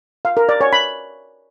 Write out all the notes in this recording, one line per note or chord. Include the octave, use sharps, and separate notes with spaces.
F5
A#4
D5
C#5
B5